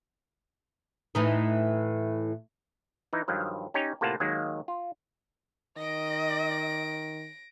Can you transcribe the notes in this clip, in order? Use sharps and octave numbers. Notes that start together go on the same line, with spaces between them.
A2 E3 D#4
E3 D#4
G2 D#3 F3 F#3
C#4 D#4 G4 C#5
A2 C3 A#3 F4 F#5 A5
D#2 D#3 F#3 G#3 A#3
F4
D#3 D#5 A#6 D7